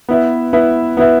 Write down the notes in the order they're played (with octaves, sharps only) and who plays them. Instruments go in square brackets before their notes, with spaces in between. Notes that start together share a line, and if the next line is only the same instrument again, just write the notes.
[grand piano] B3 E4 B4 E5
B3 E4 B4 E5
B3 E4 B4 E5